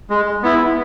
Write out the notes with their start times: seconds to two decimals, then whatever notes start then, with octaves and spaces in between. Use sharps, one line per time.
0.10 G#3
0.43 B3 E4